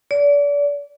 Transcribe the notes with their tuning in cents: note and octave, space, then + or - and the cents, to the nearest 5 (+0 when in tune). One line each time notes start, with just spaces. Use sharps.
D5 -35